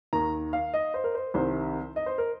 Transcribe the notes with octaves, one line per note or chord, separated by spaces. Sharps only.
D#2 D#3 A#5
F5
D#5
C5
A#4
C5
C2 C3 D#3 C5
D#5
C5
A#4